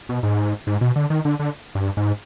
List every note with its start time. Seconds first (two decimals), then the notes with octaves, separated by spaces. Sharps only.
0.09 B2
0.23 G#2
0.67 G#2
0.81 B2
0.96 D3
1.10 D#3
1.25 D3
1.40 D3
1.75 G2
1.97 G#2